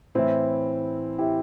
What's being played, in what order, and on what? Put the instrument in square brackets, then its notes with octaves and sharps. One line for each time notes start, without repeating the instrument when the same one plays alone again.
[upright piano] A2 E3 C4 E4
E4 G4